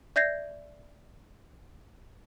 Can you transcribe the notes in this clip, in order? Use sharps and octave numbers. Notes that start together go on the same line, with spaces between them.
D5 E5 G6 G#6 A#6 C7